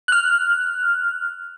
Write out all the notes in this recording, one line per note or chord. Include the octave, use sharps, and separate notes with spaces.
F6 F#6